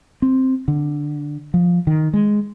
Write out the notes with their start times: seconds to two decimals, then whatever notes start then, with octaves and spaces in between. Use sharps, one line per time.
0.22 C4
0.68 D3
1.54 F3
1.87 D#3
2.14 G#3